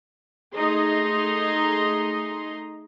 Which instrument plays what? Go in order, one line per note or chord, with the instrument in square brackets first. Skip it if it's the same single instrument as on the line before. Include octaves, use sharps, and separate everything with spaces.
[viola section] A3 D#4 G#4 D#5 A#5 C6